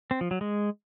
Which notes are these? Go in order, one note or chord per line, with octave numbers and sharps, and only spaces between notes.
C4
F3
F#3
G#3